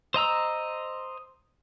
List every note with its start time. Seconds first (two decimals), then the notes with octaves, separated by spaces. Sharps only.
0.14 C5 D#5 A#5 E6